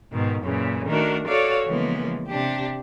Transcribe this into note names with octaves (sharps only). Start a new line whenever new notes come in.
G#2 B2 D#3
F#2 A#2 C#3 E3
D#3 A3 D4 F#4 A#4
F#4 A4 C#5 D5 F5
C#3 E3 F3 G#3 A#3 B3
C3 D4 G4